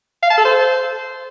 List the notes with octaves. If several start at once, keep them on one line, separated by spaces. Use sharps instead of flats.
F5
A5
A4
C5